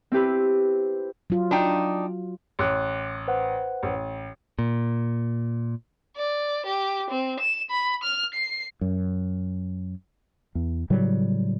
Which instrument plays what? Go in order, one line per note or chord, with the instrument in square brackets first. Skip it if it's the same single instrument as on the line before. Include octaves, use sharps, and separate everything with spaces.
[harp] C4 E4 G4 B4
[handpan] F#3 F4
[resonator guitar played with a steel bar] D4 D#4 G5
[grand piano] A1 [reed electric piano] C6 D6 F#6
[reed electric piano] B4 C5 F#5
[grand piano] A1
[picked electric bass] A#2
[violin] D5
G4
C4
E7
B5
F6
C7
[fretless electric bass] F#2
E2
A2 C#3 F#3 G3